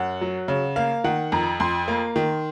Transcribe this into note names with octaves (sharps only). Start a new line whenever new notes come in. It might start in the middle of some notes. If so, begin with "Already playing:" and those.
Already playing: F#2 F#5
F#3
C#3
A#3 F5
D#3 F#5
F2 A#5
F2 C6
A#3
D#3